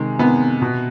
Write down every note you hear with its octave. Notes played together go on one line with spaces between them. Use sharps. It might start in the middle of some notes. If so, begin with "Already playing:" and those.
Already playing: C3 D#3 G#3
C3 D#3 B3
B2